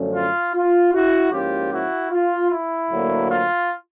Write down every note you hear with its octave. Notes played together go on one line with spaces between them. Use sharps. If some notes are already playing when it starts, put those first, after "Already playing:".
Already playing: F#2 D3 F3 A3 C#4
F4
F4
E4 F#4
G#2 F3 A#3 C#4 E4 F4 G4
E4 F#4
F4
E4
D2 D3 F#3 A#3
F4